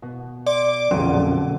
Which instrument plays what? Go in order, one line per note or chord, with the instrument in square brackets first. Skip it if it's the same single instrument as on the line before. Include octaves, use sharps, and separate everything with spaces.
[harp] B2
[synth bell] D5 [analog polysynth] D6
[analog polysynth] A#1 F2 [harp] B2 D3 F#3 [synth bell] C#4